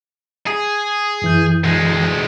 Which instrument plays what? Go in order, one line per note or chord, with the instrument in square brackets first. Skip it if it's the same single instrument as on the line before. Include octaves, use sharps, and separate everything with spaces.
[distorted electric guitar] G#4
[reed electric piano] F#2 E3 G6
[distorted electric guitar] D2 G#3